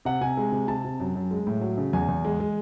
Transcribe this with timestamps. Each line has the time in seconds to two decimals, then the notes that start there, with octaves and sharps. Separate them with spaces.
0.05 C3 F#5
0.21 C3 G#5
0.37 G#3
0.52 C3
0.68 C3 A5
0.84 C3
1.00 F#2
1.15 F#2
1.31 G#3
1.47 A2
1.61 F#3
1.78 C#3
1.93 E2 G#5
2.08 E2
2.25 G#3
2.40 G#3